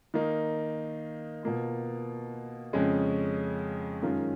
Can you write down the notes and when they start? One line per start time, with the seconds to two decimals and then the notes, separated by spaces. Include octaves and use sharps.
0.14 D#3 A#3 D#4
1.43 B2 A#3 F4
2.73 F2 C#3 G#3 C#4
4.02 F#2 D#3 G#3 C#4 F4